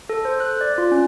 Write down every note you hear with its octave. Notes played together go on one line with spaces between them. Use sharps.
A4
C5
F#6
D5
F4
C#4